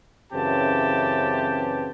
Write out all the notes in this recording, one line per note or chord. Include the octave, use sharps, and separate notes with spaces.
F#2 C#3 E3 C4 G4 A5